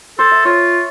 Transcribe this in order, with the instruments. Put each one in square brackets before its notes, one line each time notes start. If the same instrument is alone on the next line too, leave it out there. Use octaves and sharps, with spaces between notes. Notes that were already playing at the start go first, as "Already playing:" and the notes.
[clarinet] A4 [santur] C5
[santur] E5
[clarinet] F4 [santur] C#5